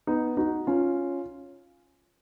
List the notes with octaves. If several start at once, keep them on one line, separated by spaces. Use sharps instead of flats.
B3 D#4
D#4 F#4
C#4 F4